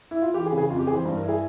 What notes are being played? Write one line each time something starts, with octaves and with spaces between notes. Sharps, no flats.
E4
F4
E3 G4
G#4
C#3
G#4
F2 F4
G4
E3 G#4
C5
G2
A#4
E4 G#4